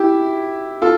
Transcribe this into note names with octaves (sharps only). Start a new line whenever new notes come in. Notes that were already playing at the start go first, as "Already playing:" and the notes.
Already playing: E4 G4
F4 A4